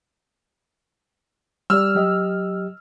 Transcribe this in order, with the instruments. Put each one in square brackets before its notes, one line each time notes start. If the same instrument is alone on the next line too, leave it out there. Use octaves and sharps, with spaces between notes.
[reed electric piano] G3 G4 D5 [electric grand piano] E6 F6
[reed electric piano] F#3 G4 D#5